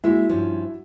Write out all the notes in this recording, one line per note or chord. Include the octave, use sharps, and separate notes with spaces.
G#3 A#3 E4 F#4 E5
G2 F3 C#4